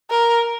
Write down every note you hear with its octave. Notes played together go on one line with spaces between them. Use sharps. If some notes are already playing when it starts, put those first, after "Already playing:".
A#4